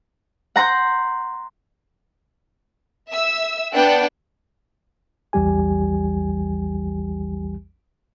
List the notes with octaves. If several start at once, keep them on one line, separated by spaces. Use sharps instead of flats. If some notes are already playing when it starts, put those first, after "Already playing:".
F#5 A#5 C6 F#6 G6
E5 E6
B3 D4 D5 F#5 G5
A#1 E2 E3 G3 G4 G#5